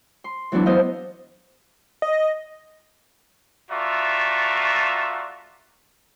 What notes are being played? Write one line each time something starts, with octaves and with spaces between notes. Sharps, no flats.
C6
E3 F#3 B3 D4 E4
B3 D4 C5 D#5 F5
D#5
A3 F4 F#4 D5 E5 A#5